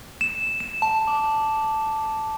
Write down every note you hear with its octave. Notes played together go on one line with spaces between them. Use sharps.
E7
E7
A5
D6